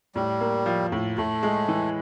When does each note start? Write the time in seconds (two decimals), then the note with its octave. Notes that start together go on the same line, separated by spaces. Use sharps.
0.15 A2 G3
0.41 A#3
0.66 F3
0.92 A2
1.18 A2 A3
1.43 G#3
1.68 E3